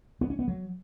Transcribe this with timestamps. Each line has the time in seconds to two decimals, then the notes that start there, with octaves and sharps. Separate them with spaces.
0.21 B3
0.30 C#4
0.39 B3
0.48 F#3